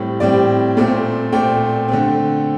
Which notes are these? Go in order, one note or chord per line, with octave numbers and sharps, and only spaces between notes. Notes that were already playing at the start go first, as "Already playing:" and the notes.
Already playing: A2 G3 C4
A2 G3 C4 D5
A#2 A3 C4
A#2 A3 C4 G5
D3 A3 C4